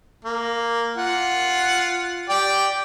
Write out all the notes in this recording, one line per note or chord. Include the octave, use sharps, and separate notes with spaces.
A#3
F4 F#5
G4 D5 G5